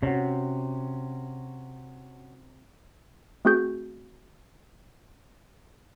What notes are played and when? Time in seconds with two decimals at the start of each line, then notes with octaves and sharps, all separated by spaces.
0.02 C3 C#4 F#4
3.45 A3 C4 F#4 G#4 G6